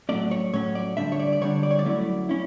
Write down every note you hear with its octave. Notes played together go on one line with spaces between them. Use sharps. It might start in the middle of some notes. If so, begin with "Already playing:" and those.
A2 F#3 A3 C#4 D5
C#5
A2 F#3 A3 C#4 C#5
D5
D3 G3 D4 E5
C#5
D5
D5
D3 G3 D4 C#5
D5
C#5
D5
F#3 A3 C#4 E4
C#4 E4